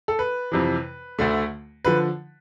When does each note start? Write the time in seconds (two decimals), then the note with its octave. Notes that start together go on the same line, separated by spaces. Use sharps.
0.08 A4
0.19 B4
0.52 F2 C3 E3
1.19 D2 D3 A3
1.85 D3 F3 B4